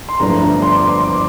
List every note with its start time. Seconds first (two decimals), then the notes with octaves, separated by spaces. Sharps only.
0.09 C6
0.20 G1 G2 F3 A3 D4 A#5
0.62 C6
0.76 D6
0.89 C6
1.04 D6